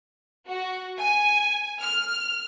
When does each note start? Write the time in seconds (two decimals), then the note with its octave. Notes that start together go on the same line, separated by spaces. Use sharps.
0.46 F#4
1.00 G#5
1.80 F6